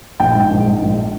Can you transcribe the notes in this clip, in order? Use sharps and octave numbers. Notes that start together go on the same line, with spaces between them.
A#1 G5
G#2
A#1
G#2
A#1